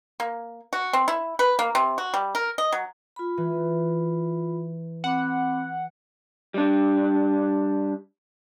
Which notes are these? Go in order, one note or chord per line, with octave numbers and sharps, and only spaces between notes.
A#3
F#4
C4
E4
B4
A#3
C3
F#4
G3
A#4
D#5
F#3
F4 B5
E3
C4 F#5 B5 D6
G3 D4